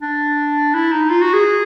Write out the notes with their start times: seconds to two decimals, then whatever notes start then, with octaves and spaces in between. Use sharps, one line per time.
0.02 D4
0.75 E4
0.92 D#4
1.10 F4
1.22 F#4
1.33 G#4